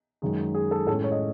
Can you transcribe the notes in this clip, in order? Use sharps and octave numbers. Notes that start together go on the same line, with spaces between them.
F#2 D#3 G#3
G#4
A4
A2 G#3 C#4 A4
C#5
D#5